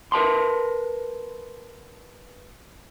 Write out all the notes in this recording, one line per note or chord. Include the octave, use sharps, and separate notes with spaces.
A#4 B4 A5 C6